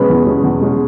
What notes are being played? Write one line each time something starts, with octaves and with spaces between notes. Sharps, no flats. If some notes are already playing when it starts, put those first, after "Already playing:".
Already playing: B2 G#3 C#4 B4
E2
B2 G#3 C#4
E2
B2 G#3 C#4